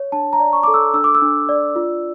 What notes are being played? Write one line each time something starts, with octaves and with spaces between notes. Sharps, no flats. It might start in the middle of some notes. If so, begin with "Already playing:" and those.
Already playing: C#5
D4 A5
A#5
D5
C#6
A4 D6
E6
D4 E6
D6
E6
D4
D5
F4